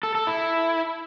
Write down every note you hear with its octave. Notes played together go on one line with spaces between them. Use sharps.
A4
A4
E4